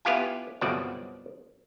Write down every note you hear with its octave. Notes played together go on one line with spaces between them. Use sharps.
B3 E4 F4 G4 F5 G#5
G1 C2 B2 F3 F#3 D5